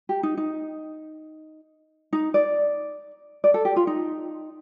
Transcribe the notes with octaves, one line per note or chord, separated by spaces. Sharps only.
G4
D#4
D#4
D#4
D5
D5
A4
G4
F4
D#4